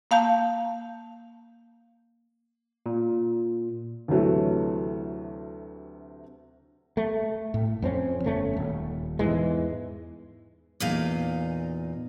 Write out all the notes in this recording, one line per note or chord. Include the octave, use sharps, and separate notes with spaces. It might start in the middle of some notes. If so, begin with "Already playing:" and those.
A#3 F5 A5 G6
A#2
D2 C3 E3 F#3 A3
A3
A2
F2 C4 C#4
G1 A3 C#4
D#1
E2 G#2 E3 G#3
E2 A#2 D#4 F5